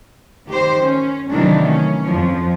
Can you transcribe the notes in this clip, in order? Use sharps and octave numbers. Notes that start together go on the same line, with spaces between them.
D#3 G4 C5
C#4
C3 D#3 E3 F#3 A3 D4
C#4
F2 F3